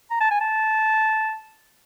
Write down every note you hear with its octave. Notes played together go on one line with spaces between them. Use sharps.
A#5
A5
G#5
A5